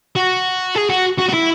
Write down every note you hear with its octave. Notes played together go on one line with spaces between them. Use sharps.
F#4
G#4
F#4
F#4
F#4
E4